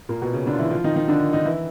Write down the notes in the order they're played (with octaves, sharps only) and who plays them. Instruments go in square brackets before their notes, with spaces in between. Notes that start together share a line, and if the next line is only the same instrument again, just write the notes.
[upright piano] A#2 A#3
B2 B3
C#3 C#4
D3 D4
F4
E3 E4
F3 F4
D#3 D#4
D#3 D#4
D3 D4
D#3 D#4
E3 E4